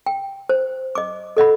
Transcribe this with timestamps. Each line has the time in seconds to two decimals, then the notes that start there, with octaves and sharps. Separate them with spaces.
0.06 G5
0.49 C5
0.95 D#5 D6
1.37 A4 D#5 F#5 B5